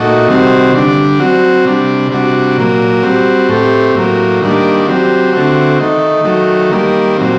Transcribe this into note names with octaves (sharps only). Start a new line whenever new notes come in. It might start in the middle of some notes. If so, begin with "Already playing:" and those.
Already playing: A#2 A3 D#4 F#4
C3 D#3 G3 C4 F#4
D3 G3 D4
F#3 C4 F#4
C3 G3 D4
C3 G3 D4 F#4
A#2 F#3 A#3
G3 C4 F#4
A2 A3 C4 G4
A2 F#3 A#3
D#3 G3 A#3 D4
F#3 C4 G4
D3 A3 C4 F#4
D#3 A3 D#4
D#3 F#3 A3
D#3 G3 A#3
A#2 F#3 C4